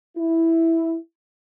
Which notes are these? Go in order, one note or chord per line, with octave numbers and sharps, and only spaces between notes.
E4